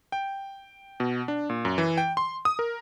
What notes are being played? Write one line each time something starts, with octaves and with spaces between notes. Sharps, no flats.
G5
B2
D4
A#2
F#2
E3
G5
C6
D#6
A#4